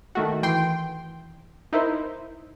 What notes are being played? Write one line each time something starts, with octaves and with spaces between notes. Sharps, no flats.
D#3 A3 F#4
E3 G5 C6
D#4 E4 A#4 C5